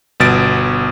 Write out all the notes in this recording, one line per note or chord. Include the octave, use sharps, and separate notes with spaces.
G1 B2 A6 D7